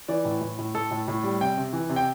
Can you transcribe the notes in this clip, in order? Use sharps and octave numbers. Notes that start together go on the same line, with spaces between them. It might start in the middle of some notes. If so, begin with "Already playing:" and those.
E3 D5
A2
A2
A2
A2 A4
A2
A2
G3
C3 G5
C3
E3
C3
G5